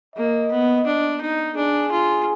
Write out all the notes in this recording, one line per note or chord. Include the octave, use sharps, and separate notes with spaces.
A#3 D#5
B3
D4
D#4
D4 G#4
F4